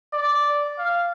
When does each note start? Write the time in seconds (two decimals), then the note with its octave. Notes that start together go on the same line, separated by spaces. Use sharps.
0.14 D5
0.79 F5